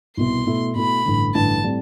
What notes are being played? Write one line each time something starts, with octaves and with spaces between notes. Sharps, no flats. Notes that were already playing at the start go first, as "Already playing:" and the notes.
C2 B2 B3 E4 C6
B2 A3 E4
B2 A3 E4 B5
A1 G2 D3
A1 G2 D3 A5
A2 G3 C4